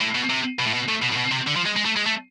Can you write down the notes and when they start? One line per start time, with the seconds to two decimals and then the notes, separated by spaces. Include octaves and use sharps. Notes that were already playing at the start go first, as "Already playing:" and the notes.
0.01 A2
0.15 B2
0.29 C3
0.59 B2
0.66 A2
0.74 B2
0.89 A2
1.02 B2
1.13 A2
1.17 B2
1.32 C3
1.47 D3
1.56 F3
1.66 G#3
1.76 G#3
1.85 A3
1.96 G#3
2.06 A3